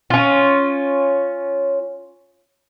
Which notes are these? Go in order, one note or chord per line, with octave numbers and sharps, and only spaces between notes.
C#4 F4